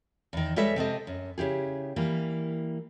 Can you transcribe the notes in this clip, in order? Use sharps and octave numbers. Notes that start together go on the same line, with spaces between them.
E2 D#3
G3 G#3 A4 B4 C#5 E5
C3 C4 A4 D#5
F#2
C#3 E4 G4 G#4
E3 G3 A#3